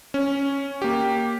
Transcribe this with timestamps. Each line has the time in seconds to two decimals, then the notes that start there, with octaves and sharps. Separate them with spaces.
0.14 C#4
0.82 A#3 G4